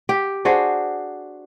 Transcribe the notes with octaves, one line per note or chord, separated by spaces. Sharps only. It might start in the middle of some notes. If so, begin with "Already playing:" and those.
G4
D4 F#4 G#4 C5